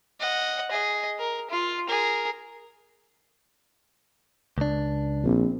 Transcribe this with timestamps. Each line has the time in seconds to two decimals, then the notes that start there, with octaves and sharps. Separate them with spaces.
0.20 D#5 F#5
0.71 G#4 D#5
1.19 A#4
1.50 F4
1.88 G#4 A#4
4.58 C#2 D4
5.24 A#1 C4